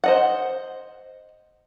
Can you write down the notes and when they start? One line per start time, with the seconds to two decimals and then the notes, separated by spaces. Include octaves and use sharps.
0.04 C5 D#5 F#5